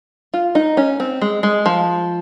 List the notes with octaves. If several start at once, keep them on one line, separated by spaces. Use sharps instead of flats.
F4
D#4
C#4
C4
G#3
G#3
F3